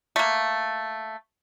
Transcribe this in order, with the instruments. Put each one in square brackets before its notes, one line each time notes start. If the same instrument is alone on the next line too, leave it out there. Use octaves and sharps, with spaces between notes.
[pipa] A3 A#3